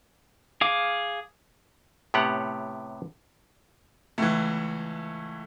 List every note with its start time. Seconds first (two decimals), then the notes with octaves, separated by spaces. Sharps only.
0.61 G#4 F5 D6
2.14 A2 C3 B3 G4 C#5 F#5
4.18 C#2 E3 A3